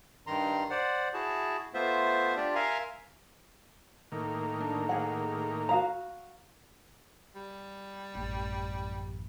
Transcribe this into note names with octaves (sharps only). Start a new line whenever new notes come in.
G2 D#3 A#5 C6
C5 D5 F#5
E4 F#4 G#4 A5
A3 B3 F4 C5 E5
D4 F4 G4 D5
A#4 E5 F5 G#5 A#5 C6
A2 D#3 A#3
D4
G#4 F#5
F#4 F5 A#5
G3
A1 F#2